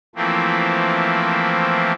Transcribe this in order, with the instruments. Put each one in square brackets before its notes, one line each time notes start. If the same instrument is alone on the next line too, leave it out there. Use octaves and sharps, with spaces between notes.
[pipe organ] E3 F3 A3 A#3 C4